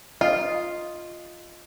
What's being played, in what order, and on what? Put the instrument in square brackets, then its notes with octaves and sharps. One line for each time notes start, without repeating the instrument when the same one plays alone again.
[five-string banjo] F4 [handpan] D#5